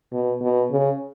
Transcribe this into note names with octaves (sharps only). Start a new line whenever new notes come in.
B2
B2
C#3